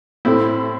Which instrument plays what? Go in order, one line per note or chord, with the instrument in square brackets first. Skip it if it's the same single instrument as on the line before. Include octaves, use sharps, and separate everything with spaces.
[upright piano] A2 [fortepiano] C4 E4